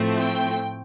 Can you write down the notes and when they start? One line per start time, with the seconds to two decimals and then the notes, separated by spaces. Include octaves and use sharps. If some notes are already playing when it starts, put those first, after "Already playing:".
Already playing: A2 F3 A3 C4
0.20 G5